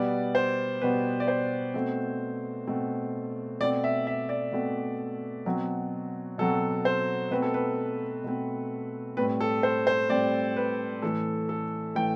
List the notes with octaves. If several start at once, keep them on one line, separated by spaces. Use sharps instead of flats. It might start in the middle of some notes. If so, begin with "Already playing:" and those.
Already playing: B2 G3 B3 D5
C5
B2 G3 B3 B4
D5
C5
B2 A3 C4
B2 A3 C4
B2 A3 C4 D5
E5
E5
D5
B2 A3 C4
B2 F#3 C4
B2 F#3 C4 A4
C5
B2 A3 C4 B4
A4
B4
B2 A3 C4
A2 G3 C4 B4
A4
C5
C5
A2 G3 C4 D5
B4
A2 E3 A3 A4
A4
A2 E3 A3 G5